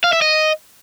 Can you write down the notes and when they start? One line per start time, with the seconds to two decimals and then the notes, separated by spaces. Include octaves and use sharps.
0.04 F5
0.13 E5
0.22 D#5